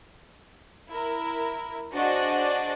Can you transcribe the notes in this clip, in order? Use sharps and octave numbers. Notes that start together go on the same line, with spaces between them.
E4 A#4
D4 F#4 G#4 C5 D5 D#5